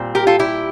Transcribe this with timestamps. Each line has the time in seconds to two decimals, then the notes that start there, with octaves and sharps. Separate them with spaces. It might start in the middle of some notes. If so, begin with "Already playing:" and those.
Already playing: A#2 G3 C4
0.15 G4 A#4
0.27 F4 A4
0.39 E4 G4